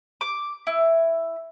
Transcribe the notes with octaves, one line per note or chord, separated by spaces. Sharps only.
D6
E4